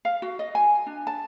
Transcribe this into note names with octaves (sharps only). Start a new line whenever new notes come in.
F5
F#4
D#5
G#5
D4
A5